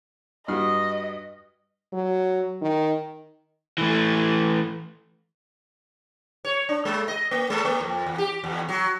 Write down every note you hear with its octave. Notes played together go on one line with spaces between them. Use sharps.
G2 F#4 D#5 F6
F#3
D#3
E3 A3
C#5
D4
G#3
D#5
A#3
G#3
A#3
F2
E2
G4
E2
F#3